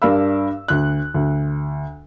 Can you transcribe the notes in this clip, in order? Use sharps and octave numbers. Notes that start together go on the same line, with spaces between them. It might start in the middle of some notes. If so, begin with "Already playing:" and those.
G2 D4 A#4 F5 B5 E6
D2 F#6
D2